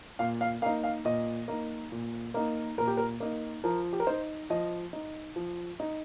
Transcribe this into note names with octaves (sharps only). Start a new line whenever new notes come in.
A#2 F5
F5
A#3 D#4 F5
F5
A#2 D#5
A#3 D#4
A#2
A#3 D#4
A#2 A#4
G4
A#4
A#3 D#4
F3 A#4
G4
A#4
D#4 C5
F3 D#5
D#4
F3
D#4